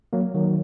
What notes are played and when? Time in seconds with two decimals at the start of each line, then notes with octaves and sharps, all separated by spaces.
0.13 F#3 A#3
0.35 D#3 F#3